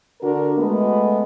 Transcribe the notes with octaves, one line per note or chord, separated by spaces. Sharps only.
D3 D4 F#4 A#4
G#3 A3 B3